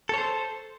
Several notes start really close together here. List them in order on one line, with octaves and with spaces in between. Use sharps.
A4 C#5 C5